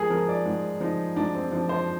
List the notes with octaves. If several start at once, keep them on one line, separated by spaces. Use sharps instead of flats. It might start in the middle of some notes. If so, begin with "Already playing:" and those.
Already playing: G#2 F3 G#4 A#4
F3 A#4
D5
G#2
F3 D#4
G#2 D4
C4
F3 D4
C5